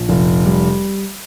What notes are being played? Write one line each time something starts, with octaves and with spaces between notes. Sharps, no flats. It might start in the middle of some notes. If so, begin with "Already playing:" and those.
Already playing: A#1
F1
G3